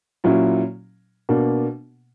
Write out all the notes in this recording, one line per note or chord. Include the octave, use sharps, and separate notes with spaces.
A#2 F#3 C#4 E4
B2 A#3 D4